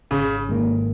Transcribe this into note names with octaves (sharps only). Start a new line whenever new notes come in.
G#1 C#3
G#2 D#3 A#3